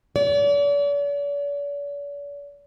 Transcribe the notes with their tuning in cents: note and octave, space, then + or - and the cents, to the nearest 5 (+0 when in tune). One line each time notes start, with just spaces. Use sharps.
D5 -45